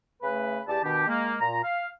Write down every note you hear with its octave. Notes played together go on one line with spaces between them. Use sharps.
C#3 A3 B4
E2 G4 D5 A5
B2 D#3 D4 G4
G#3 A#3
A#2 A#5
F5